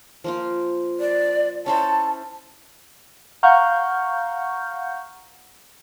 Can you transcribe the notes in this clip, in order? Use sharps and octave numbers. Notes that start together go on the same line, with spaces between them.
F3 A#3 F4
D5
C#4 E4 C5 A5
F5 F#5 A#5 C#6 F6 G6